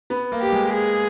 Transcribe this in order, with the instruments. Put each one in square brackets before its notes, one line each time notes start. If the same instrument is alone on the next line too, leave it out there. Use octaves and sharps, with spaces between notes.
[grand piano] B3
A#3
[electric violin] G4
[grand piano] G#3
[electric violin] G#4